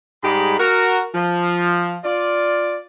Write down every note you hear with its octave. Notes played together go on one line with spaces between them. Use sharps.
G#2 G3 G#3 G4 B5
F#4 A#4
F3
F4 D5